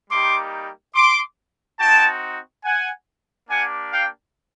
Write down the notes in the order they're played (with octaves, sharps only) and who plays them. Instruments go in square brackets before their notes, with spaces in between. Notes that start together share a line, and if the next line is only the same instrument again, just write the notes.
[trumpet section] G3 A#3 D#4 G4 C6 D6
C6 D6
C4 D#4 F#4 G5 A5
F#5 G#5
A#3 D4 G4 F#5 G#5
F5 G5